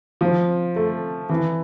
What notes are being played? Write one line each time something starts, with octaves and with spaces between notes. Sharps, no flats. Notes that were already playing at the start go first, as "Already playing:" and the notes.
F3
A3
E3